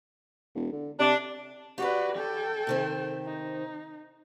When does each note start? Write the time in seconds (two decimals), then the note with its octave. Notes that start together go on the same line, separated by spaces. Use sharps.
0.55 E1
0.72 D3
0.99 C3 D4
1.78 F#4 G4 B4 C#5 D5
2.15 A4 G5
2.67 C3 D#3 C4
3.26 D#4